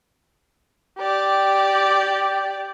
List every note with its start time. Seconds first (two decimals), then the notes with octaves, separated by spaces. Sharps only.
0.98 G4 D5